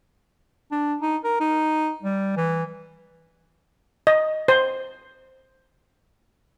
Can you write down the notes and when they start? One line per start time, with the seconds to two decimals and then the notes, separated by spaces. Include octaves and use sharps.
0.72 D4
1.01 D#4
1.24 A#4
1.40 D#4
2.03 G3
2.36 E3
4.07 D#5
4.48 C5